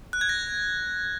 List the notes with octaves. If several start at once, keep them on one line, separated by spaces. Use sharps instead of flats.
F#6
G#6
A#6